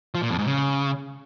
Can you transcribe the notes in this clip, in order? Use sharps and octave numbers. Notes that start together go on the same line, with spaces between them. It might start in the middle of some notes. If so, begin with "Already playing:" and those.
F3
A#2
F2
G#2
C#3